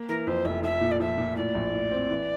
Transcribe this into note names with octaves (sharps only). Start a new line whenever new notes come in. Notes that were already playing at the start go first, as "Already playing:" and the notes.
Already playing: A#3
E3 A#4
F2 C5
F1 E5
F3 E5
A#2
D5
F3 E5
A#2
A2 D5
A#1
A2
C4
E3